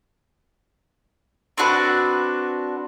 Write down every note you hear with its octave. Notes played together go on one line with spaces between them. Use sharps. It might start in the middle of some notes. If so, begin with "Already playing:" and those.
C4 D4 F#4 B4